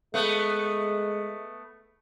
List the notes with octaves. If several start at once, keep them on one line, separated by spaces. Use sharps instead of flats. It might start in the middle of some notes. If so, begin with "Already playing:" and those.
G#3 A3 B3